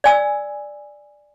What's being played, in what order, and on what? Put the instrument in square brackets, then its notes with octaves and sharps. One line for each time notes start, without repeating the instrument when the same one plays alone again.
[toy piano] D5 G#5 E6